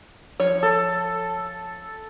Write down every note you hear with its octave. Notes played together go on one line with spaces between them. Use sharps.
F3 C#5
A4